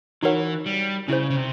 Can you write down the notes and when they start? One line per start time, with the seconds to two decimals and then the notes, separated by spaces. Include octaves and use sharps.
0.22 E3 D#4 F#4 A#4 C#5 F#5
0.66 G3
1.08 C#3 C#4 E4 G#4 C5
1.30 C#3
1.36 C3